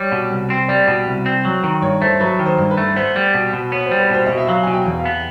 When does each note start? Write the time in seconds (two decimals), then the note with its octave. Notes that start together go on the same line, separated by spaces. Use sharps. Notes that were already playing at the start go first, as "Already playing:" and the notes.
Already playing: G3 C#5
0.12 B2
0.31 C2
0.50 C4
0.68 G3 D5
0.88 B2
1.07 C2
1.26 C4
1.45 F#3
1.64 D#3
1.82 G2 C#5
2.02 A3 C5
2.20 F#3 B4
2.39 D#3
2.46 C5
2.58 G2
2.71 B4
2.77 A3
2.96 B3 C5
3.16 G3
3.34 B2
3.53 B2
3.72 B3 C#5
3.86 C5
3.91 G3
4.00 B4
4.10 B2 C5
4.26 B2 D#5
4.37 E5
4.48 F#3 F5
4.63 B2 G#5
4.74 G5
4.86 E2
4.99 F5
5.05 B3